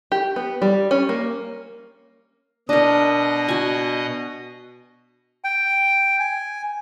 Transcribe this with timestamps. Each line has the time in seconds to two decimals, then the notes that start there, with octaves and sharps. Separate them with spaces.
0.12 G4
0.36 B3
0.62 G3
0.91 C#4
1.09 A#3
2.69 B2 D4 A#4 D#5
3.48 F#4 G#5
5.44 G5
6.20 G#5